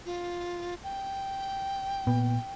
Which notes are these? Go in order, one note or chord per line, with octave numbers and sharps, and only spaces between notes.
F4
G5
A#2 B3